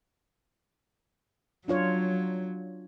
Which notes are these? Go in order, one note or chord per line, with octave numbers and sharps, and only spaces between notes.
F#3 D4 F4 C#5